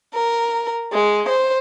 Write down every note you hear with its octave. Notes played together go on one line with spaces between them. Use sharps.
A#4
G#3
C5